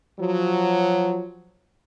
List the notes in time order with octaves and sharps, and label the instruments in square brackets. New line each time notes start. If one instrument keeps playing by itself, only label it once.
[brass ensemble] F3 F#3